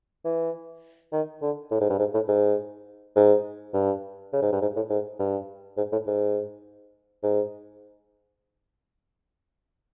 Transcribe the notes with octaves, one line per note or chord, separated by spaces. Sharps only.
E3
D#3
D3
A2
G#2
G2
G#2
A2
G#2
G#2
G2
C#3
G#2
G2
G#2
A2
G#2
G2
G#2
A2
G#2
G#2